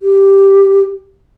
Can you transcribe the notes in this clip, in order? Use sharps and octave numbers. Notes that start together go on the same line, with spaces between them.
G4